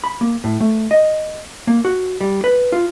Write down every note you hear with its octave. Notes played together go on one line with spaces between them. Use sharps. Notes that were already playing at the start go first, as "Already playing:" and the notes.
B5
A#3
A2
A3
D#5
A#3
F#4
G3
B4
F4